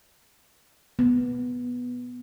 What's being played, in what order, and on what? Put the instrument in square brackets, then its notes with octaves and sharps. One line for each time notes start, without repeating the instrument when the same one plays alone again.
[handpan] B3